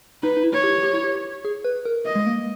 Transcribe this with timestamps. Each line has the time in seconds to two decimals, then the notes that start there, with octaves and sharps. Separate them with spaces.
0.23 D#4 B4
0.37 D#4
0.43 E4
0.53 C#5
0.63 G4
0.83 G4
0.93 E4
1.04 G4
1.45 G#4
1.64 B4
1.85 A#4
2.06 D#5
2.16 G#3
2.26 A#3